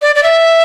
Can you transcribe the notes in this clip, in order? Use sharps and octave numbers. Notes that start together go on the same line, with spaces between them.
D5
D5
E5